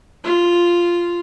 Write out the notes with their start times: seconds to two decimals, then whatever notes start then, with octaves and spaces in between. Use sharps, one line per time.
0.24 F4